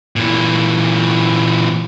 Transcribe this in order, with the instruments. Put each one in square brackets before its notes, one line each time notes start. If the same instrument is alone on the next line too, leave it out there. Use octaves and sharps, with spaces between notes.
[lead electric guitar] A#2 E3